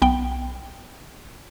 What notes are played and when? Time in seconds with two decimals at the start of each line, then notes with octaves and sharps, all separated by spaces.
0.02 B1 B3 G5